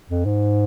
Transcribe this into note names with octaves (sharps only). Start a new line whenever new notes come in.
F2
G#2